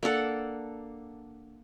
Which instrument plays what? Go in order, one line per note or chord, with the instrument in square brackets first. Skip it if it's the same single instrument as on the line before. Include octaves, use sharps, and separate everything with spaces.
[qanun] A#3 D4 A4 F#5